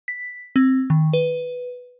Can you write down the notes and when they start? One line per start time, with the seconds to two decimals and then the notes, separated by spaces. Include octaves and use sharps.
0.08 B6
0.56 C4
0.90 D#3
1.13 B4